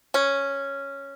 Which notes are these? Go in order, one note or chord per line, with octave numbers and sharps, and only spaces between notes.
C#4